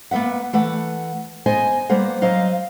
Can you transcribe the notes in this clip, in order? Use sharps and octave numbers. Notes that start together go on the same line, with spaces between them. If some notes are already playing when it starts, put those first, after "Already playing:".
A#3 B3 B4 E5 F#5
E3 A3 B4 F#5
B3 C5 D#5 G#5
G3 A#3 B3 C5 F#5
F#3 C5 D#5 F5